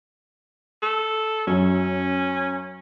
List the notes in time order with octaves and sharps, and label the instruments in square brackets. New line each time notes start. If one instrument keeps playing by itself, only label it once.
[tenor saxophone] A4
[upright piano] F#2 [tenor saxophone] C#4